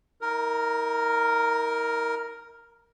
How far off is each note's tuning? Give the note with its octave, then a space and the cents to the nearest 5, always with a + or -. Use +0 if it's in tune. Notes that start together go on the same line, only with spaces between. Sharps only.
D#4 +40 A#4 +0